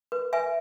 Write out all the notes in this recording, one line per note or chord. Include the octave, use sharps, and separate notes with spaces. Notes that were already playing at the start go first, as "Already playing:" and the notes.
B4
B4 E5 G#5